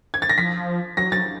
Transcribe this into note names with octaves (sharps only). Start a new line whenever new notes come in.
G#6
A6
A#6
F3 B6
F#3 A#6
F#3 A6